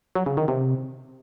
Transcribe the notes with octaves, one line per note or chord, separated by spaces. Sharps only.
F#3
C#3
D#3
C3